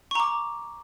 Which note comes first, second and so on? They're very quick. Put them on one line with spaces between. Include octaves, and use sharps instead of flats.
C#6 A#5 D6